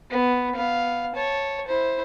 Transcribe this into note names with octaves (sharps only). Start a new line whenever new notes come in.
B3
B3 F5
C#5 A5
E4 C5